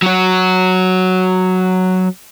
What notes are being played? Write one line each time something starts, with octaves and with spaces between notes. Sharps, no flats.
F#3 F#4